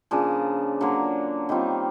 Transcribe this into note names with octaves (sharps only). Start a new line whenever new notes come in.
C#3 F3 A#3 D4
D3 F#3 A#3
D#3 G3 C4 F4